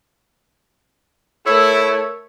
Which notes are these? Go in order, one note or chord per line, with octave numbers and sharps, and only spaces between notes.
A3 E4 A#4 C#5 E6